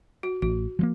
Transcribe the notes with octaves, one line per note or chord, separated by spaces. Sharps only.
F#4
A1 F#4
F3 F#3 A#3